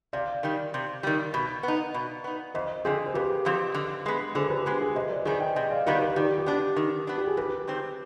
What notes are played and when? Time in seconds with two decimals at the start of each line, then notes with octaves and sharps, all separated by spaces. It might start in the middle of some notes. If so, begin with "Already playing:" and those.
0.13 C3 D5 F5
0.43 D#3 G3
0.74 C3
1.03 D#3 G3
1.34 B2
1.63 B3 D#4
1.94 B2
2.24 B3 D#4
2.54 F2 C5 D#5
2.85 D3 F3 C4 G#4
3.06 C5
3.14 F2 G4 B4
3.45 D3 F3 C4
3.74 D3
4.06 G#3 B3
4.35 D3 G#4 C5
4.46 C5
4.50 G4 B4
4.66 G#3 B3 G4
4.81 G#4
4.95 C3 C5 D#5
5.10 B4 D5
5.25 D#3 G3 B3 D#4 G#4 C5
5.41 D#5 G5
5.56 C3 D#5 G5
5.71 D5 F5
5.86 D#3 G3 B3 D#4 G4 B4
6.01 B4 D5
6.16 D#3 G4
6.38 G4
6.46 B3 D4
6.76 D#3
7.07 B3 D4
7.18 G4
7.27 G#4
7.37 G#2 G4 B4
7.67 D#3 G3 C4